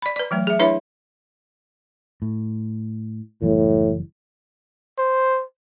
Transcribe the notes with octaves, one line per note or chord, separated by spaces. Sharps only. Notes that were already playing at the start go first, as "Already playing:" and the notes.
D5 B5
B4 D5
E3 F#3 A3
G#4 E5
D4 E4 B4 C#5 E5 B5
A2
F#1 A2 E3 G3
C5